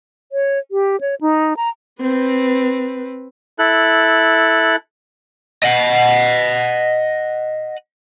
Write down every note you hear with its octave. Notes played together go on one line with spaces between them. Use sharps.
C#5
G4
C#5
D#4
A#5
C4 B4
E4 A4 F#6
D#5 F#5